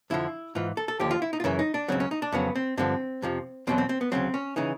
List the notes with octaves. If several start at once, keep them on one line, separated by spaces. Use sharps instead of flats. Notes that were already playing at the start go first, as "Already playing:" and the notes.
F2 D3 F3 E4
G#2 E3 F4
A4
A4
D#2 D3 F3 G4
F4
E4
D#4
F4
F#2 C#3 E3 E4
D#4
D4
C#2 C#3 F#3 C4
C#4
D#4
D4
F2 C#3 F#3 B3
C4
G2 D3 F3 C4
F2 C3 F3
E2 B2 F#3 C4
C4
C4
B3
D2 C#3 F#3 C4
C#4
C#3 E3 D#4